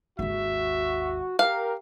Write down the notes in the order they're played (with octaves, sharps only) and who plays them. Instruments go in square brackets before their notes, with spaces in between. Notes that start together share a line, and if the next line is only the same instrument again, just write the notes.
[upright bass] G#1 D#2 [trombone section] F#4 [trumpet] E5
[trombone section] G4 A#4 [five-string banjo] F5